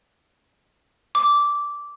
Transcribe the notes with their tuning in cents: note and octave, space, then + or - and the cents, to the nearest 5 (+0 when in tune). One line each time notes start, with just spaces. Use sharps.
D6 -10